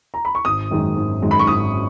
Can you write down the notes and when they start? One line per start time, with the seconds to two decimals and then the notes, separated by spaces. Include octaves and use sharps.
0.14 A#5
0.25 B5
0.35 C#6
0.45 G#1 D#6
0.71 F#2 D#3 G#3
0.96 G#1
1.22 F#2 D#3 G#3
1.31 B5
1.39 C#6
1.47 G#1 D#6